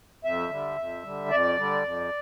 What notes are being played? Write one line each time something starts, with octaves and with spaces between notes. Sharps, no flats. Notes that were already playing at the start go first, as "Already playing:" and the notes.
F2 E5
D3 G3
F2
D3 G3
F2 D5
D3 G3
F2